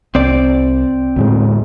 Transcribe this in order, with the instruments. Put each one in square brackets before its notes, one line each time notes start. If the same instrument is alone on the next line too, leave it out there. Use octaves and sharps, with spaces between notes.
[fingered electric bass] C2 [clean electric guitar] C4 D5
[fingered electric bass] D2 A2 G#3